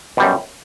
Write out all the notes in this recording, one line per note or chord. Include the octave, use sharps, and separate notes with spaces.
F#2 B2 G3